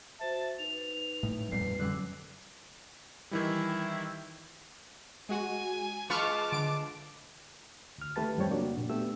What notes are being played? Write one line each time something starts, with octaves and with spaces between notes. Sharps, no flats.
F#4 C5 E5 A5
D#4 B4 F7
A2
F2 A#2 G3 B4 C7
F#2 D3 G3 D6 E6 F#6
D#3 E3 G3 E4
G#3 F#4 G#5
G#3 F4 B4 A5 C#6 D6 F6
D3 D7
D2 F6
D#3 A3 G4 B4 A5 A6
F#2 F3 G3 C4 C#5 G5
F2 C#3 A#3 D4 F#4 D5
A#2
A3 B3 D4 G4 E6